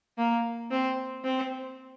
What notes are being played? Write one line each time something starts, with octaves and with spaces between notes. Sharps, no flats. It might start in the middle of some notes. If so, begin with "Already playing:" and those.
A#3
C4
C4